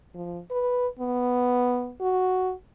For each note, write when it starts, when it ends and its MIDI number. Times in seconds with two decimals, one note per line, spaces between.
0.15 0.40 53
0.51 0.87 71
0.99 1.92 59
2.00 2.52 66